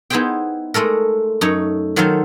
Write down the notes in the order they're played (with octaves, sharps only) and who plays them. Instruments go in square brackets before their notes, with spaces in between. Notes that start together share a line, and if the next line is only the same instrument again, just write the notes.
[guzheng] B3 D#4 E4 G#4 C5 G5
G#3 A3 A4 A#4
F#2 A3 D#4 C#5
D#3 F#3 F4 A4 C5 F5